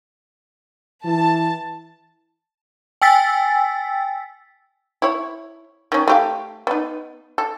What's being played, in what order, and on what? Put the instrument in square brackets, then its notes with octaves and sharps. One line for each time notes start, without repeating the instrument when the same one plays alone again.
[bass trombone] E3 [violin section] A5
[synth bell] G5 G#5 E6 A6 B6
[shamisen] E4 C#5
D#3 C#4
A3 G4 F5
B3 D#4
A4